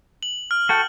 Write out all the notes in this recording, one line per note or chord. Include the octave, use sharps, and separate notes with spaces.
F#7
F6
F#4 A4 G5